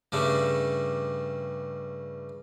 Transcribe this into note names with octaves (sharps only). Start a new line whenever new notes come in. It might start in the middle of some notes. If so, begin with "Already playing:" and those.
G2 C#3 G3 A3